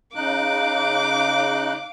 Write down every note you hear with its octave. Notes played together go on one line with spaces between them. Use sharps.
C#3 D#4 F5 D6 F#6